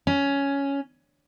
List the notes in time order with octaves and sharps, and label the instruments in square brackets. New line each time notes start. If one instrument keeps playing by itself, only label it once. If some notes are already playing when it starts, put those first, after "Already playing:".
[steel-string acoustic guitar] C#4